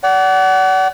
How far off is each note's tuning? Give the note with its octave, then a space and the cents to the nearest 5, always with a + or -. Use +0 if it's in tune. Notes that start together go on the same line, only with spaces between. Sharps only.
D5 -35 F#5 +25